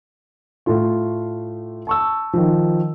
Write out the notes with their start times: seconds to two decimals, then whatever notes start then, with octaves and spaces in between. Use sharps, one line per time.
0.66 A2 A3 F4 C6
1.87 A5 C#6 E6
2.33 D#3 F3